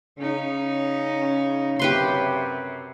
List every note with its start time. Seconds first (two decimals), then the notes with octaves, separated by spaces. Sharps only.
0.19 C#3 C#4 D#4
1.79 F#2 C3 G4 B4 C6